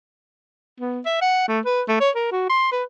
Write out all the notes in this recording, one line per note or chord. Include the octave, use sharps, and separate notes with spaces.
B3
E5
F#5
A3
B4
A3
C#5
A#4
F#4
C6
B4